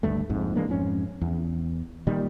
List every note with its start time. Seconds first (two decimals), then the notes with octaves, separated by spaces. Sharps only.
0.03 G#1 D2 G2 A3
0.29 A#1 F2 G#2
0.55 E3 G#3 A#3 D4
0.69 F2 G#2 C#4
1.21 E2
2.07 A#2 D#3 G3